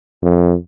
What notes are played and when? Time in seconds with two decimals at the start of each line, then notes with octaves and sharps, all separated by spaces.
0.22 F2